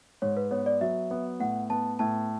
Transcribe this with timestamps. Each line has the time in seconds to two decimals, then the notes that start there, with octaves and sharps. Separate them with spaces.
0.22 G#2 C#5
0.37 B4
0.51 B3 C#5
0.66 D5
0.81 F#3 E5
1.11 B3
1.40 A2 F#5
1.70 B3 A5
1.99 A2 A5